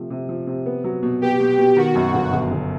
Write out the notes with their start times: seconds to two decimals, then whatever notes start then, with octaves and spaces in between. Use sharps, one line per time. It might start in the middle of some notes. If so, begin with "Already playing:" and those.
Already playing: C3 F3 A3
0.10 C3
0.29 F3
0.47 C3
0.66 B3
0.84 F#3
1.03 B2
1.21 B3 G4
1.40 B2
1.59 B2
1.77 D#3 F#4
1.95 F#2
2.14 G1
2.33 G1
2.51 G1